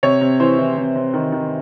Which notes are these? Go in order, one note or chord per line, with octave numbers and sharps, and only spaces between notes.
C3 C#5
C3
E3 C5
E3
C3
C3
D#3
D#3